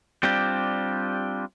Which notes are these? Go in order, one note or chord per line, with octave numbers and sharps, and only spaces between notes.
G3 C4 D4 F4 G4